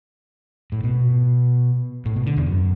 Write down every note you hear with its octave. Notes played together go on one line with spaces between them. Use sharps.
A2
B2
A2
B2
D3
E2
F#2